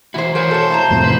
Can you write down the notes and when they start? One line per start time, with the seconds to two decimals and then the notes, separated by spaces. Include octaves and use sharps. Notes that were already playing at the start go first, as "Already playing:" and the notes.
0.14 E3 E4 F#4 C5
0.35 E3 F#4 A#4 C5 C#5 G#5
0.51 A4 C#5
0.70 E4 A5 A#5
0.91 F2 A2 C3
1.04 B4